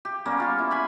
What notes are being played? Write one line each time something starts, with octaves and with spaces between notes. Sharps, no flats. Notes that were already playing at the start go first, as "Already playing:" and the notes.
G4
G3 A#3 B3 C#4
F4 C#5
E4
G#5 B5 C6